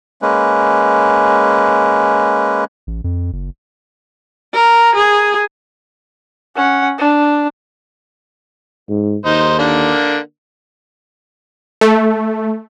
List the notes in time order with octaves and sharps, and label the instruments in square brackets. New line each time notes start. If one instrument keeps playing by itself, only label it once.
[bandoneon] G#3 A#3 C#4 B4
[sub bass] A1
F2
F#1
[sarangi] A#4
G#4
[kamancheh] C#4 F#5
D4
[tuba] G#2
[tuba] D#2 [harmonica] D#4 C5
[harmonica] D3 A#3 D4
[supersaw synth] A3